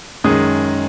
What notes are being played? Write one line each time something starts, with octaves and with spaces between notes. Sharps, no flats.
F#2 D#3 G#3 D#6